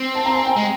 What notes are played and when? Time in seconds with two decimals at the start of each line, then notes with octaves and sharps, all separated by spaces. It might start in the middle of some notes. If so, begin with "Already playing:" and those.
Already playing: C4
0.15 A5
0.26 A#5
0.35 G#5
0.46 G5
0.56 G#3